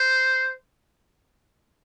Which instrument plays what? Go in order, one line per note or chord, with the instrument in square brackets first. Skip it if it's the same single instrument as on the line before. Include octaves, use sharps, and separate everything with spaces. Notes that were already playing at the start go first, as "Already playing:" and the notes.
Already playing: [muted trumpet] C5